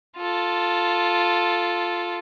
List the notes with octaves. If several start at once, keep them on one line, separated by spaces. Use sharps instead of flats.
F4 A4